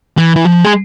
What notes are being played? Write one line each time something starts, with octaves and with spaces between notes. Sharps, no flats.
E3
E3
F3
G#3